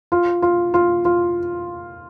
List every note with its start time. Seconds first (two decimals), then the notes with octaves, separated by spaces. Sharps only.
0.12 F4
0.42 F4
0.74 F4
1.05 F4